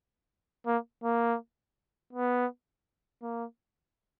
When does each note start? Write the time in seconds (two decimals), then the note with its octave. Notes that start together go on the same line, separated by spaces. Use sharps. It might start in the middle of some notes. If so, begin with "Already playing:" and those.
0.66 A#3
1.03 A#3
2.13 B3
3.22 A#3